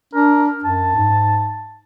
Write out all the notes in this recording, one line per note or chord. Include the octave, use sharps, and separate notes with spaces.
D4 A#4
F#2 A5
G#2